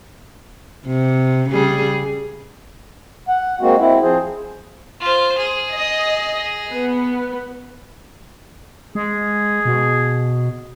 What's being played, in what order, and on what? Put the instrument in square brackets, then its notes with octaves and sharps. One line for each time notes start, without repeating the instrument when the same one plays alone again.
[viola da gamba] C3
C#3 G3 G#4
[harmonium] F#5
G#3 A#3 C4 F#4
C4 E4
F3 C4 G#4 C5
[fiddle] F4 C5
G#4
[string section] D#5
B3
[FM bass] G#3 [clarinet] G#4
[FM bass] B2